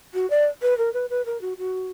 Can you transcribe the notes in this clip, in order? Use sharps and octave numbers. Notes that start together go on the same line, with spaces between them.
F#4
D5
B4
A#4
B4
B4
A#4
F#4
F#4